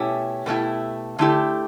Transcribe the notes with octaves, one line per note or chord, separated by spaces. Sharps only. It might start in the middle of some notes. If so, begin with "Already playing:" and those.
Already playing: B2 A3 C#4 E4 G4
B2 A3 C#4 E4 G4
D3 A3 E4 G4